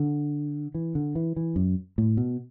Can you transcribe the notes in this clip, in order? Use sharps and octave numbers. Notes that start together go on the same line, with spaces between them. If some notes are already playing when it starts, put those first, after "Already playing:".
Already playing: D3
E3
D3
E3
E3
F#2
A2
B2